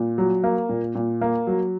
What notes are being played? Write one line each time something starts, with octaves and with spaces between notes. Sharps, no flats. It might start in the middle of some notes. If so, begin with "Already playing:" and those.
Already playing: A#2
F#3
A#3
A#2
A#2
A#3
F#3